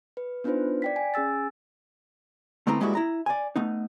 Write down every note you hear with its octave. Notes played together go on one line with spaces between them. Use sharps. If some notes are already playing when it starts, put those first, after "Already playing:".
B4
B3 D4 D#4 F4 B4 C5
D5 G5 B6
G#5
C#4 G#4 G#5 E6 A6
D3 A3 B3 C4 E4 A#5
G3 G#3 A#3 B3 E4 F#4
E4 A#5
D5 G#5
A3 B3 D#4